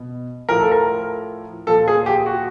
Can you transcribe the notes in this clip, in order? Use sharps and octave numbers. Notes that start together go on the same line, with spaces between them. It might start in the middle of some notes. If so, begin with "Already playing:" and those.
Already playing: B2
A2 F3 A#4
A4
A#4
A#2 F3 A4
G#4
G4
F#4